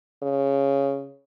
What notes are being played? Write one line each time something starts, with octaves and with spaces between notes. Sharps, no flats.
C#3